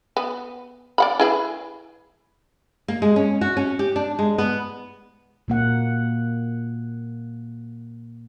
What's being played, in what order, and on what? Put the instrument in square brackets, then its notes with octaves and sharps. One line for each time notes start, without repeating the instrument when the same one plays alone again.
[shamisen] B3
D5 F#5 B5
E4 G#4 B4
[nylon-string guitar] A#3
G#3
C#4
F#4
C#4
G4
D4
G#3
B3
[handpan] A#2 A#3 F#5